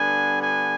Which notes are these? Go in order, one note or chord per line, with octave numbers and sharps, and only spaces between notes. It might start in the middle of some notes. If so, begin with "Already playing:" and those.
Already playing: D3 G3 B3 D4 G#5
G#5